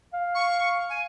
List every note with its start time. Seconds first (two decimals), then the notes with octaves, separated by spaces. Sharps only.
0.14 F5
0.35 C#6
0.89 G#5